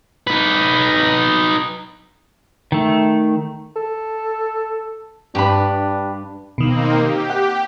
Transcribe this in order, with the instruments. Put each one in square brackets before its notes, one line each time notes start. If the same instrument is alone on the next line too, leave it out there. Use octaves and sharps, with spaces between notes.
[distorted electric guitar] D#4 B4
[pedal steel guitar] D#3 A3
[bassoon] A4
[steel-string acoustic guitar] G2 [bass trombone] D4 [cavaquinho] G4 B4 B5
[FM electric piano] B2 D#3 [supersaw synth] A#3 C4 D#4
[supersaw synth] G4
[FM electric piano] F#5